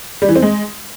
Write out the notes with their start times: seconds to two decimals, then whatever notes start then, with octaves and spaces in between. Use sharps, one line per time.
0.22 G3
0.29 E3
0.35 C4
0.42 G#3